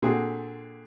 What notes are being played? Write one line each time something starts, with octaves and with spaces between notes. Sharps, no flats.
A#2 D3 A3 C4 F#4 G#4